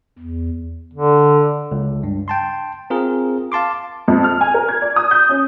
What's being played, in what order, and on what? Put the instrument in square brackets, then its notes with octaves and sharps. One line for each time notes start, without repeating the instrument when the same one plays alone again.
[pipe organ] E2
[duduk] D3
[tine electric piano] C#2
G2
G5 A5 C6
C4 F4 G#4 A#4
F5 A5 C6 D6
[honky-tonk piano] F2
F6
G#5
A#4
G#6
D5
D#6
G6
C#4